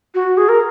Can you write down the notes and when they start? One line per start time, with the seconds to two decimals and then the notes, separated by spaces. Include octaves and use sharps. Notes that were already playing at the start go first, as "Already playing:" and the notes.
0.14 F#4
0.37 G#4
0.48 A#4